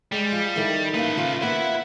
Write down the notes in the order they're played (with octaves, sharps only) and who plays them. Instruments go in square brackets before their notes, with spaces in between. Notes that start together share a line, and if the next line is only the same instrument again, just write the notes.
[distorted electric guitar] G3 [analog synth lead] G#3
[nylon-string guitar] F3
[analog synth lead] D#3 [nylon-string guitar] E4 A4
[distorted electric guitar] A3 B4 [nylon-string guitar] A#3 F5
[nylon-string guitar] C#3 [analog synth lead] F4
[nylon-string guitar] A#3 B3 F4 [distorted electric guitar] E5 B5 [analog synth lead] F#5